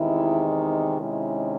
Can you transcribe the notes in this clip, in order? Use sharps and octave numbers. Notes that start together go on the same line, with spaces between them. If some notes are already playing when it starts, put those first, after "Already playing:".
Already playing: E2 C3 D#3 G#3 E4
C3 D#3 G#3 C#4 E4